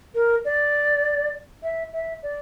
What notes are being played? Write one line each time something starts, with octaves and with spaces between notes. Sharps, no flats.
A#4
D5
E5
E5
D5